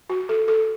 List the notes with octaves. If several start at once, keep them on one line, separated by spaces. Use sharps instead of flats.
F#4
A4
A4